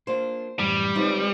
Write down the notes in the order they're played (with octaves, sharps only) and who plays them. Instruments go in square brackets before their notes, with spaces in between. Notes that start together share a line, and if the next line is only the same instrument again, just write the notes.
[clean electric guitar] A#3 D4 F4 [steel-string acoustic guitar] C5
[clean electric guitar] F#2 A2 E3 [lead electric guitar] G3
[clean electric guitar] G#3 B4 C#5 [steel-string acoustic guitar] C4 D#4 F4